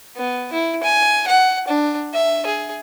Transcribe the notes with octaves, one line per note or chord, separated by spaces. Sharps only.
B3
E4
G#5
F#5
D4
E5
G#4